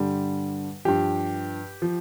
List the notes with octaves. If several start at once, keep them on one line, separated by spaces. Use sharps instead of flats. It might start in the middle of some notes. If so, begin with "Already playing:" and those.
Already playing: G2 D3 G3
G2 F3 G4
F3